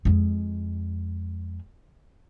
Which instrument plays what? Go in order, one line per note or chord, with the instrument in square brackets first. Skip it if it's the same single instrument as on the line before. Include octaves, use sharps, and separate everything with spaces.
[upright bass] F2 G#3